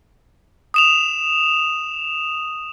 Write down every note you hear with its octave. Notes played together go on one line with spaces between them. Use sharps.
D#6 E7 F7